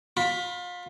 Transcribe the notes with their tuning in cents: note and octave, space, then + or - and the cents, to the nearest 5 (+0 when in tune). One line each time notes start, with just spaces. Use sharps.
F4 +30 B5 +0